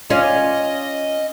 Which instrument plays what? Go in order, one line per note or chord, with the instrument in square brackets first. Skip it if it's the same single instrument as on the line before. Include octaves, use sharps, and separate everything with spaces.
[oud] C#4 F4 D5 [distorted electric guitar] D#5